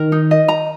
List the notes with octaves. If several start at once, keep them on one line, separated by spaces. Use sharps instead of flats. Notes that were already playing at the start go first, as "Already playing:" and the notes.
Already playing: D#3 A#4
D#4
D#5
A#5